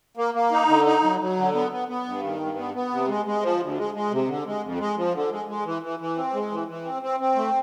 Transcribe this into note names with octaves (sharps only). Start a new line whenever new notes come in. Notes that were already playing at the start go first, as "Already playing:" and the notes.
A#3
A#3
D#4
D3
D#4
F#3
F#3
D3
B3
B3
B3
G2
D#3
G2
B3
B3
C3
G#3
G#3
F3
D2
G#3
G#3
C3
D3
G#3
F2
G#3
F3
D3
G#3
G#3
E3
E3
E3
C4
G#3
E3
E3
C4
C4
C4
A3